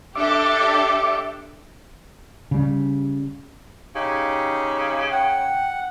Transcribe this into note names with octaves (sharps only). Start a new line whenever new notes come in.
D4 G4 A4 E5 D6
C#3 G3
C#3 D#4 G4
F#5 G5